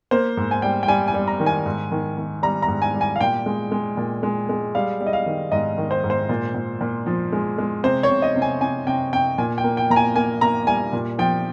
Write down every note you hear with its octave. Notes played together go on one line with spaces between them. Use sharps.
A#3 C5
G#2
G#5
G3 G5
G5
G3 G#5
G#5
G3
A#5
D#3
G#5
G#2
D#3
D#3
G3 A#5
A#5
G#2
G#5
G3
G#5
F5
A#2 G5
G#3
G#3
A#2
G#3
G#3
G3 F5
G3
D#5
F5
D#3
G#2 D#5
D#3
C5
G#2
C5
A#2
A#2
A#2
F3
G#3
G#3
C3 C5
C#5
C3
D#5
C3
G#5
C3 G#5
C3 G5
C3 G5
A#2 G#5
G5
A#3
G5
A#2 A#5
G#5
A#3 G#5
A#3 A#5
G3 G#5
A#2
F3 G5